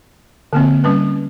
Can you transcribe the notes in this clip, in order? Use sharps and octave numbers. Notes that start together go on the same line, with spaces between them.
D3 A#3 C4
G3 C#4 B4